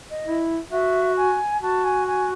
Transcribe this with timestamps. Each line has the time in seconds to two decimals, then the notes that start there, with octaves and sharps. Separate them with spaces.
0.10 D#5
0.26 E4
0.71 F#4 E5
1.17 G#5
1.62 F#4 A5
1.84 G#5
2.07 G#5